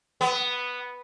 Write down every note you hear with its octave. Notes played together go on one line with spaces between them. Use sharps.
B3